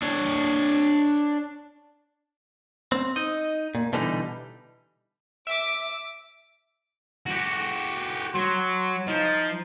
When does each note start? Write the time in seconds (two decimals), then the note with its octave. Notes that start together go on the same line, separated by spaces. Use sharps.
0.02 D4 C#5
2.92 C4
3.16 D#4 D#5
3.75 A#2
3.93 B2 D3 E3 G3 D#4
5.47 E5 D6 D7
7.26 F#4 G4
8.34 F#3 C6
9.07 F3 D#4